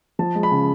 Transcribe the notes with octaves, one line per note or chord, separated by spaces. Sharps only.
F3 A5
G#3
B5
C#3